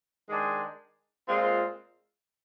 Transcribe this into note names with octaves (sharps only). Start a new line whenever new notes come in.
D#3 G#3 D4 G#4 C5
A#2 G#3 C4 F4